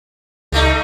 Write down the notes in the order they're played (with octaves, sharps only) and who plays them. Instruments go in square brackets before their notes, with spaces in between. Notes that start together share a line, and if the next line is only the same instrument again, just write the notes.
[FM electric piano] C#2 D#5 [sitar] G3 A3 D#4